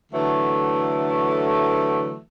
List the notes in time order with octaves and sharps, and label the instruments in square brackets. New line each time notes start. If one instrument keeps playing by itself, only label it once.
[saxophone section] D3 E3 F#3 A3